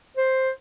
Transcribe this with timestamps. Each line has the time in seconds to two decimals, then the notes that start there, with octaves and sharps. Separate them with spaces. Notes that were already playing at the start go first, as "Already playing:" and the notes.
0.17 C5